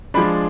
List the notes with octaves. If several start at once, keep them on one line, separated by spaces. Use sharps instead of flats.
F3 G#3 D4 B5